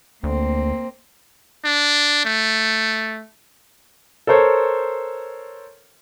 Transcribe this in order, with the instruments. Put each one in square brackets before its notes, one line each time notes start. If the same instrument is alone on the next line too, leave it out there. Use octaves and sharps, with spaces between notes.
[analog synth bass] D2 [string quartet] A#3 C4
[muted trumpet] D4
A3
[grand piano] A4 A#4 C5 C#5